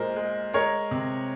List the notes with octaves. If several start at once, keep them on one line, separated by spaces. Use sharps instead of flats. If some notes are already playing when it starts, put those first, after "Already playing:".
Already playing: A#2 G#3 A#4 C5
G#3
G#3 A#4 C#5
C3